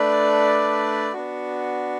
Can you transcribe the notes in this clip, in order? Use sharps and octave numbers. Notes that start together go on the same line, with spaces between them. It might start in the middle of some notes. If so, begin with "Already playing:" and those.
Already playing: A3 D4 B4 D5
B3 D4 F#4